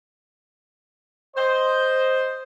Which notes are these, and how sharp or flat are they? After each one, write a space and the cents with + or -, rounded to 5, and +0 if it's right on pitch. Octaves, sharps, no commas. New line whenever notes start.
C5 +0 D#5 +0